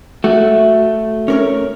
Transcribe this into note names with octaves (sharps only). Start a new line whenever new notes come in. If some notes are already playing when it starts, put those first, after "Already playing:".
A3 F#4
C#4 A#4 C#5